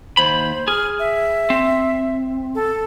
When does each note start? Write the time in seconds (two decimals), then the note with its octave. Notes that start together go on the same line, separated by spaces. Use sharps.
0.17 D#2 C5 B5
0.68 G#4 F6
0.99 E5
1.50 C4
2.55 A4